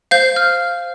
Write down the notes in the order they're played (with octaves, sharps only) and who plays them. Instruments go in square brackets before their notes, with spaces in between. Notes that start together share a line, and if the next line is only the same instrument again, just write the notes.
[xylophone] C5 F5 G6
F6